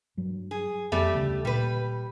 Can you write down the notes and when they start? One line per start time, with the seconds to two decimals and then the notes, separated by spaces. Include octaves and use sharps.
0.17 G2 F#3
0.51 G#4
0.92 F2 G3 A3 B3
1.14 D2 C#3
1.45 A#2 G3 B4